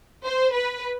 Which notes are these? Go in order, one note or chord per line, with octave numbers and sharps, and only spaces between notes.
C5
B4